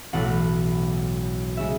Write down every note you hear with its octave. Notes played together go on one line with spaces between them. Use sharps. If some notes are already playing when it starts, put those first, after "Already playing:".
B1 A2 E3 A3 F#5
C#3 G#3 E5